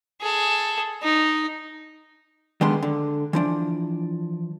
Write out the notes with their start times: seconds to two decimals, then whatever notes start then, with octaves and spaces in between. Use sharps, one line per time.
0.21 G#4 A4
1.03 D#4
2.61 D#3 G3 G#3 B3 D4 C6
2.83 D3
3.33 E3 F3 D4